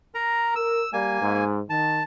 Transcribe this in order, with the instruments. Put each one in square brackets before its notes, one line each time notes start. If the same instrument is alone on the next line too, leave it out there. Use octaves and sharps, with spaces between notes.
[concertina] A#4 A#5
[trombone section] A#4 [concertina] E6
[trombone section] G3 [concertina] A#3 G#5
[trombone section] G#2
[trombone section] D#3 [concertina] A5